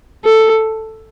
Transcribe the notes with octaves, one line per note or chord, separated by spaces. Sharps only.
A4